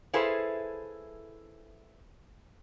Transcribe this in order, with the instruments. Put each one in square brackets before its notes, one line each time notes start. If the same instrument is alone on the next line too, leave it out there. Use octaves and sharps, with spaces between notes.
[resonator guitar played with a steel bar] E4 G#4 A4 B4 C5 F5